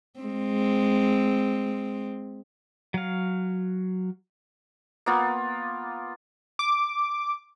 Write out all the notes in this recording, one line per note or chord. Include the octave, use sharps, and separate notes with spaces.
G#3 C4
F#3 F5
A#3 B3 F4
D6